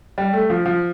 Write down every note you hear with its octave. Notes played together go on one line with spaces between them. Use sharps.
G3
A3
F3
F3